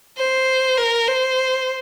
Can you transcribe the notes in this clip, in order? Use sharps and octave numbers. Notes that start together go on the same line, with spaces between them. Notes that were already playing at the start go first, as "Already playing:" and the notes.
C5
A#4
C5